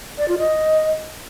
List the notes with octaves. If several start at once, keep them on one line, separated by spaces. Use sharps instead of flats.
D5
F4
D#5